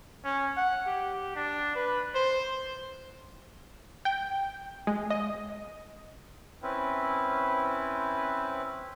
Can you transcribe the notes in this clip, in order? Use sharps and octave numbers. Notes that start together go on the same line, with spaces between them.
C#4
F#5
G4
D4
B4
C5
G5
G#3
D#5
C4 C#4 E4 B4